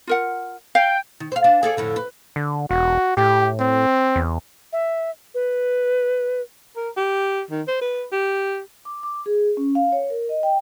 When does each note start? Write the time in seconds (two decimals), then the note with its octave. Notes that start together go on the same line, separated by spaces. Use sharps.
0.07 F4 A#4 F#5
0.75 F5 G5
1.20 D#3
1.32 C5 F5
1.44 D4
1.63 G#4 A4 D5
1.77 F2 A2 D3
1.96 B4
2.36 D3
2.70 E1 F#4
3.17 A2 G4
3.59 C4
4.16 E2
4.73 E5
5.34 B4
6.76 A#4
6.97 G4
7.50 D#3
7.68 C5
7.81 B4
8.12 G4
8.85 D6
9.03 D6
9.26 G#4
9.57 C#4
9.75 F5
9.92 C#5
10.10 A#4
10.29 D#5
10.43 G5